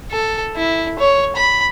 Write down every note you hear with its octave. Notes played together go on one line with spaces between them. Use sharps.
A4
E4
C#5
B5